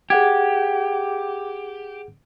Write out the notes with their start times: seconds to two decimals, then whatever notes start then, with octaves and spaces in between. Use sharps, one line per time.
0.10 G4 G#4 F#5 G#6